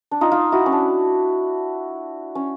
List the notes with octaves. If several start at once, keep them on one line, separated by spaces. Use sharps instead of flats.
D4
D#4 F4
D#4 F4
E4 F#4
C#4
D4
C#4